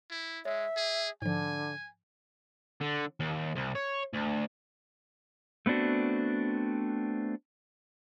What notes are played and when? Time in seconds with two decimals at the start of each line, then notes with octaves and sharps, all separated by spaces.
0.11 E4
0.45 G#3 C#5 E5
0.77 G#4
1.22 G#2 D3 F3 G#5
2.81 D3
3.20 D#2
3.56 C2
3.75 C#5
4.14 D2
5.66 A3 B3 C4 D4 F#4